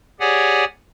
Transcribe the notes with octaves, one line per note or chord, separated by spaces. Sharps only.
G4 G#4 C#5 D5 F#5 G#5